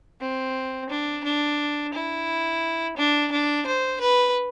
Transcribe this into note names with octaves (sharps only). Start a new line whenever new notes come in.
C4
D4
D4
E4
D4
D4
C5
B4